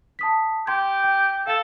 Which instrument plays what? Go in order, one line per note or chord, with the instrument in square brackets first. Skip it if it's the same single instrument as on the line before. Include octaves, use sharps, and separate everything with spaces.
[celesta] A5 D#6 B6
[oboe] G4 [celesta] G5 C6 G#6
[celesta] G5
[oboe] A4 [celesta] F5 A6